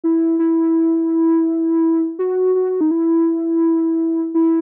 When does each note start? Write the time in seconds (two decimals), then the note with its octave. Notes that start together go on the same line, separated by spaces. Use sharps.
0.04 E4
0.39 E4
2.19 F#4
2.55 F#4
2.81 D#4
2.91 E4
4.34 E4